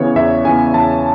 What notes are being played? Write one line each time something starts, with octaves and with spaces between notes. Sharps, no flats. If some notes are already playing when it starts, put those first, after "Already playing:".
Already playing: C#3 E3 B3 C#5
E2 E5
C#3 E3 B3 G#5
E2 A5